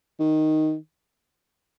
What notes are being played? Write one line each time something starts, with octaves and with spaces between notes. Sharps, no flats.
D#3